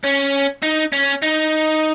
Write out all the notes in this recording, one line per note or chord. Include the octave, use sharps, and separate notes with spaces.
C#4
D#4
C#4
D#4